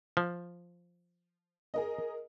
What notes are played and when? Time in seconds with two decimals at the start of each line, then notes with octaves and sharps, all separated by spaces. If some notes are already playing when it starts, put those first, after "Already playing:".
0.17 F3
1.74 G#4 A#4 D#5